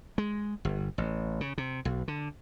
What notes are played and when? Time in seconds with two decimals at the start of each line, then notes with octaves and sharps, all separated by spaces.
0.18 G#3
0.65 G1
0.98 A1
1.41 C#3
1.58 C3
1.85 B1
2.08 D3